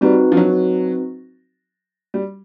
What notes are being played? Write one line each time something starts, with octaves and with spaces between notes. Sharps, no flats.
G3 C4 D#4 F#4 B4
F3
F#3
G3